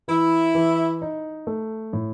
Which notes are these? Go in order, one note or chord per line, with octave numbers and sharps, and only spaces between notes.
E3 E4
E3
D#4
A3
A2